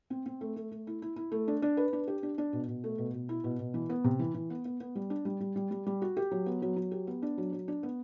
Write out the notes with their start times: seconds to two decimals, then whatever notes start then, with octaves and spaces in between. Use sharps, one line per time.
0.10 C4
0.26 C4
0.41 A3
0.56 A3
0.71 A3
0.87 E4
1.02 E4
1.16 E4
1.32 A3
1.48 D4
1.62 D4
1.77 B4
1.93 D4
2.07 G4
2.23 D4
2.38 D4
2.53 B2
2.68 B2
2.84 A3
2.98 B2
3.13 B2
3.29 E4
3.44 B2
3.59 B2
3.74 E3
3.90 B3
4.04 C3
4.19 E3
4.34 E3
4.50 B3
4.65 B3
4.80 B3
4.95 G3
5.10 D4
5.25 G3
5.40 G3
5.56 G3
5.71 G3
5.86 G3
6.02 F#4
6.17 G4
6.31 F#3
6.46 B3
6.62 F#3
6.76 F#3
6.91 G4
7.07 B3
7.22 D4
7.38 F#3
7.53 F#3
7.68 D4
7.83 B3